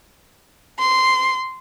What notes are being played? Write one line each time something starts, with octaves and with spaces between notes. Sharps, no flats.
C6